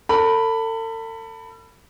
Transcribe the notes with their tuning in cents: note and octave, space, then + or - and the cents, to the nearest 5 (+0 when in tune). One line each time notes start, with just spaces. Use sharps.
A4 +40 B5 +0